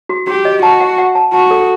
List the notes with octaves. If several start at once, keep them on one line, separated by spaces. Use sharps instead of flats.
F#4
F#4 G4
D#5
F#4 A5
F#5
F#5
A5
F#4 A5
A4